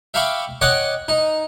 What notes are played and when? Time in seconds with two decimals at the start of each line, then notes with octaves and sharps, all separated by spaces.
0.14 E5 F5 G5 B5 C#6 D6
0.61 C#5 D#5 F#5 G5 D6
1.08 D#4